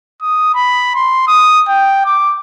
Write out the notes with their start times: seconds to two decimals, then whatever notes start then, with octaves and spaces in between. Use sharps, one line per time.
0.22 D#6
0.54 B5
0.95 C6
1.27 D#6
1.68 G5
2.05 D6